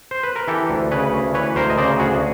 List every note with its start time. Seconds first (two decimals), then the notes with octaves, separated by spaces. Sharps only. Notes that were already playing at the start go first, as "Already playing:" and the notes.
0.11 C5
0.23 B4
0.36 A#4
0.48 E3 G4 A4
0.70 D2
0.91 C#3 B4 C#5
1.13 D2
1.34 E3 B4 C#5
1.56 D2 A#4 C5
1.70 D#5
1.78 C#3 C5 D5
1.99 D2 F#4 G#4